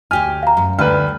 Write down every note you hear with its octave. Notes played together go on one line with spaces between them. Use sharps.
D2 G4 G#5 F6
F5 A#5
F#2
D2 G3 B4 F6